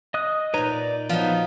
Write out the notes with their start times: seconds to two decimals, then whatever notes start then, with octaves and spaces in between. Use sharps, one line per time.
0.14 D#5 D#6 F#6
0.54 A#2 D#4 B4 C#5 A#5
0.72 D5
1.09 F3 F#3 B3 D#4